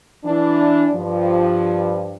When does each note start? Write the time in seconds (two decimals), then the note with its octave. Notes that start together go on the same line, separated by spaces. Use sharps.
0.25 E3 D4
0.93 G2 F3